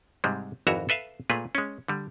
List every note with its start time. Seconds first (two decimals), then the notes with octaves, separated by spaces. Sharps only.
0.24 G#2 C3 G3 G#3
0.67 G#1 F2 E3 F#4 E5 A#5
0.89 A4 B4 E5 F5
1.30 A#2 A3 G#4 B4
1.55 G#3 C#4
1.88 D3 G3